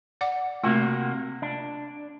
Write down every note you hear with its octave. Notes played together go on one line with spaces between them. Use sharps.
D5 F#5 D6
C3 A3 A#3 F4 F#4
D4